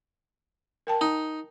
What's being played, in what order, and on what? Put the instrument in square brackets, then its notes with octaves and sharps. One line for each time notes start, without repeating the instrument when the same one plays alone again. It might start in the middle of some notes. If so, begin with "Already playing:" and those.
[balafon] A#4 G5 A5
[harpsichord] D#4